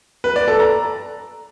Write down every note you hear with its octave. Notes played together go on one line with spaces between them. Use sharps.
B4
D5
A4
A#5